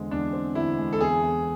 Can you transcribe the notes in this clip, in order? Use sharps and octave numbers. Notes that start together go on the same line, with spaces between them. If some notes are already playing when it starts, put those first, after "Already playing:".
Already playing: E2 D3 G#3 C4
E2 D4
C4
D3 E4
G#3
A4
E2 G#4
E2